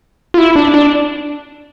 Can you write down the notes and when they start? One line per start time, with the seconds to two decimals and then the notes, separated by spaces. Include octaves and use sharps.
0.34 F4
0.38 E4
0.56 D4
0.74 D4